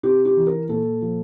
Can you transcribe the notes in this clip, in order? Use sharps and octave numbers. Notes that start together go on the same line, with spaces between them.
C3 G4
G4
E3
A#4
A#2 A4
F3